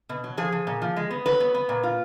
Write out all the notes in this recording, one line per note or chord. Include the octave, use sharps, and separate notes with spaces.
B2
F#3
F3 G#4
F3
A#2
F3
G#3
B3
F#3 B4
B3
B3
A#2
F4